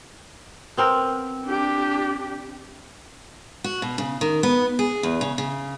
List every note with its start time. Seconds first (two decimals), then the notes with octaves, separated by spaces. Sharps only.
0.77 B3 C4 A#4
1.47 D4 G4
3.64 F#4
3.82 B2
3.98 C#3
4.21 D#3
4.43 B3
4.79 G#4
5.03 E2
5.21 C#3
5.38 C#3